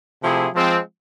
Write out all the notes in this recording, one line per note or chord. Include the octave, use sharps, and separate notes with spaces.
C3 F3 A3 E4 G#4
F3 G#3 C4